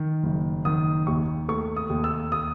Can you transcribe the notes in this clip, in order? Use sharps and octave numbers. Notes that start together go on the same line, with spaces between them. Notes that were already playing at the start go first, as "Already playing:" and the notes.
Already playing: D#3
F#1
D#3 D#6
D#2 C#6
A3 C#6
D#6
D#2
E6
D#6